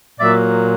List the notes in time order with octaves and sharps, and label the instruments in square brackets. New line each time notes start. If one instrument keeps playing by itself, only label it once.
[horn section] A#2 F#3 A#3 D5 E5